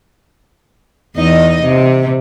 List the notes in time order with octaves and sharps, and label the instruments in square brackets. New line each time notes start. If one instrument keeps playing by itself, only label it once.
[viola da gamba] E2 D#4 D#5
C3